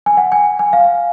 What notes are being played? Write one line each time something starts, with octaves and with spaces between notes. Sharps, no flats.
G#5
F#5
G#5
G#5
F5